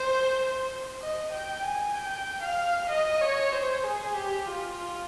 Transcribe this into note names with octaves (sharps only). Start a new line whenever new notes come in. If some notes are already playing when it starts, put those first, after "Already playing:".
Already playing: C5
D#5
G5
G#5
G5
F5
D#5
C#5
C5
G#4
G4
F4
F4